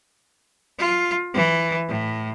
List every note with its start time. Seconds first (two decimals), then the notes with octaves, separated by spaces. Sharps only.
0.79 F4
1.34 E3
1.88 A2